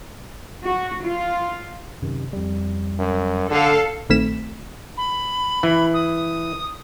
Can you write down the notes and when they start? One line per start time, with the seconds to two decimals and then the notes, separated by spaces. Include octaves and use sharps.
0.66 F#4
1.06 F4
2.02 F#2 C3 D#3
2.33 F2 G3
2.99 F#2
3.50 D3 A4 F5
4.10 A#1 D#3 A3 C4 B6 E7
4.97 B5
5.63 E3
5.94 D#6